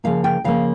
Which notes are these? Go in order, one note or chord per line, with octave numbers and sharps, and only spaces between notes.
C#3 F3 A#3 F5
G5
C#3 F3 A#3 F5